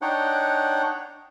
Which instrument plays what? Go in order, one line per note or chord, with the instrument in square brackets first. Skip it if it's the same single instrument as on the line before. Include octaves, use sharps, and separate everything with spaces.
[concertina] D4 D#4 C#5 F#5 G5